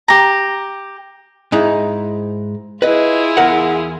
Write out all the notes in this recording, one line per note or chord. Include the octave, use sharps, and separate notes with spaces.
G4 A#5
G#2 D#4 E4
E4 F4 G#4 B4 D#5
E2 A#4 F#5